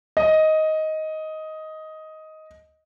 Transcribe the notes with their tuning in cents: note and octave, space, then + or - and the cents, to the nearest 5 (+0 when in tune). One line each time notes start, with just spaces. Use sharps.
D#5 +10